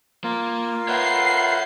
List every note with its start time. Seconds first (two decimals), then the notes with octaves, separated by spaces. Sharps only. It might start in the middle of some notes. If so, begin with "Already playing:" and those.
0.24 A#3 F4 A#4
0.88 B4 C#5 E5 F#5 C7